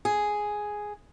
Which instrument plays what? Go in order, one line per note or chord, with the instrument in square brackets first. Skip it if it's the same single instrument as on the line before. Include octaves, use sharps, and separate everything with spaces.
[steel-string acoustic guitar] G#4